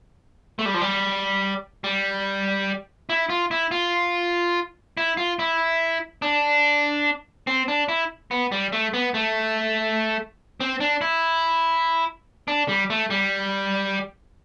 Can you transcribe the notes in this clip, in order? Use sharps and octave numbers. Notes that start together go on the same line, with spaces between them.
A3
G3
F3
G3
G3
E4
F4
E4
F4
E4
F4
E4
D4
C4
D4
E4
B3
G3
A3
B3
A3
C4
D4
E4
D4
G3
A3
G3